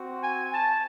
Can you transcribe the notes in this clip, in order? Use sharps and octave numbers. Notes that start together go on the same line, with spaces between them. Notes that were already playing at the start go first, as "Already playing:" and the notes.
Already playing: C4 F#4
G#5
A5